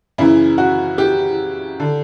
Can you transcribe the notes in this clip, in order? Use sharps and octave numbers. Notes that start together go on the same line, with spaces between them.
F#2 C#3 E3 E4
F#4
G4
D3